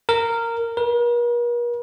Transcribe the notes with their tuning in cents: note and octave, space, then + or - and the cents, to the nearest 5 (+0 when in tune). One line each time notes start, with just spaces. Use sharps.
A#4 -15
A#4 +45